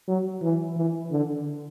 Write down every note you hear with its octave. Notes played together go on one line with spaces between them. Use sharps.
F#3
E3
E3
D3